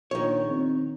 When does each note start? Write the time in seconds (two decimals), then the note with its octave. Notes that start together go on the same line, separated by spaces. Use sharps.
0.11 A#1 D#3 C#5
0.50 C4